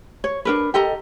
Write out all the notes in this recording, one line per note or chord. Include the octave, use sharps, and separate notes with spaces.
C#5
D4 A#4 B4
G4 A4 D#5 A#5